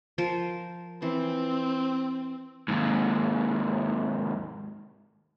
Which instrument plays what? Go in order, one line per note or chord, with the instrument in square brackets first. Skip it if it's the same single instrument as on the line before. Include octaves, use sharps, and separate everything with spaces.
[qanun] F3 A#4 C5
[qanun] E3 C5 [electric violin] C4
[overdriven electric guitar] D#2 G#2